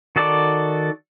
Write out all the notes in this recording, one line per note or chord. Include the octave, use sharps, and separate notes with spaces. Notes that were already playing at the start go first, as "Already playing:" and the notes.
D#3 F#4 A4 D5